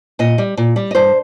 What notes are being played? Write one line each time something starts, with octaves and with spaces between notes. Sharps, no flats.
A#2 D#5
G3
A#2
G3
D#5
G2 C5